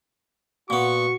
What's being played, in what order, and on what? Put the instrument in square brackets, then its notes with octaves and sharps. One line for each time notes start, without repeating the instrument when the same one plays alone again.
[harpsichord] A#2 B3 [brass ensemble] F#4 [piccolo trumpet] C#6